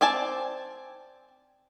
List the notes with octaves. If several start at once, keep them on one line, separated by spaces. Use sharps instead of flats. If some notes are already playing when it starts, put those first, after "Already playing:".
C4 D5 G#5 A5